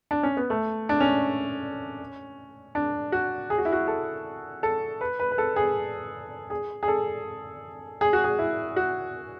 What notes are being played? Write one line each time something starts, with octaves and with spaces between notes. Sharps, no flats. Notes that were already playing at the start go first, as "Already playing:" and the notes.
D4
C#4
B3
A3
D4
C#4
D4
F#4
G#4
F#4
E4
F#4
A4
A4
B4
B4
B4
A4
G#4
G#4
G#4
A4
G#4
F#4
G#4
E4
F#4